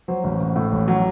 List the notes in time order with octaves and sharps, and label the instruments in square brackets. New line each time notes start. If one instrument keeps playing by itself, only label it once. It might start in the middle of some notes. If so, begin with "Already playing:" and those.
[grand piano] F#3 C5
A1
A1
A2
A1
F#3